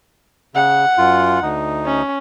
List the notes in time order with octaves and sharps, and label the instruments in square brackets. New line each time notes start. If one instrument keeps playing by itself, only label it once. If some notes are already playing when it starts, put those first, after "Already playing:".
[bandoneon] C#3 [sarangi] F#5
[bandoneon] F#2 F4
D2 D#4
[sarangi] C#4